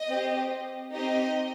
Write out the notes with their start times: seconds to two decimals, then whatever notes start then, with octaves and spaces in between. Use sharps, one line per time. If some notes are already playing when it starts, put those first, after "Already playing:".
Already playing: D#5
0.09 C4 G4
0.93 C4 D#4 G4 D#5